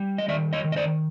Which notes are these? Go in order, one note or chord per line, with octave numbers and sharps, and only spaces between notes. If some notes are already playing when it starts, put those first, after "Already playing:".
Already playing: G3
D#5
D#3 D5 E5
C#5 D#5
D#3
D#5
C5 D5